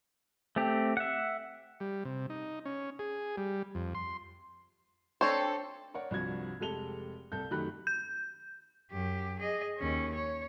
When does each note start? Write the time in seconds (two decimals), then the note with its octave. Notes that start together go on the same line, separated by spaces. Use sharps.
0.56 A3 C4 G4
0.97 E5 F#5
1.80 G3
2.05 C3
2.30 D#4
2.65 C#4
2.99 G#4
3.37 G3
3.75 F2
3.95 C6
5.21 C4 D4 A4 C5 C#5
5.94 A#4 C#5 D5 F#5
6.11 C2 G2 F3 F#4 G#6
6.61 F1 G#3 G4 A4 F7 G7
7.32 C2 A4 G6
7.51 F#2 D#3 A3 G4 B5 F#6
7.87 G6
8.92 F#2 G4
9.39 G#4 D#5
9.78 D#2 C#4
10.14 C#5